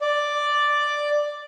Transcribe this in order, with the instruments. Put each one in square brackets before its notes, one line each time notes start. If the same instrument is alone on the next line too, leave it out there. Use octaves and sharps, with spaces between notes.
[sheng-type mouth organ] D5